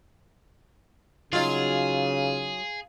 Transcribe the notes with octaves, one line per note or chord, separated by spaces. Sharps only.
C#3 F#3 D#4 F4 G#4